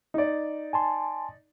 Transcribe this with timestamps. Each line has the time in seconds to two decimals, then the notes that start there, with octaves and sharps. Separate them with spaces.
0.14 D#4 D5
0.73 G#5 A5 C6